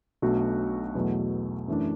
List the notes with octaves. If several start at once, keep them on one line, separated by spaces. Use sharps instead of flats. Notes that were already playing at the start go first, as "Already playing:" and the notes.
B1 B2 A3 D4 F#4
E2 B2 F#3 A3
F#2 E3 A3 D4